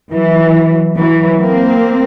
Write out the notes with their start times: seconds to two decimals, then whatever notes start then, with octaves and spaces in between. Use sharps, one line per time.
0.12 E3 F#3
0.97 E3 F#3
1.40 A#3 C4